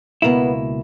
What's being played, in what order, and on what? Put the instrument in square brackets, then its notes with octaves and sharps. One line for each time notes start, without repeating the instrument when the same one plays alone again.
[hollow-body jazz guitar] C#2 B2 A#3 E4 [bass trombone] B3